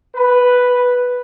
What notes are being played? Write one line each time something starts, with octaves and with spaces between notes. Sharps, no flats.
B4